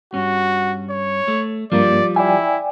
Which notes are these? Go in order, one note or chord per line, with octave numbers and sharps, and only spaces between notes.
G2 C#4 F#4
C#5
A3
G2 F3 G3 A#3 D5
E4 D5 G5 G#5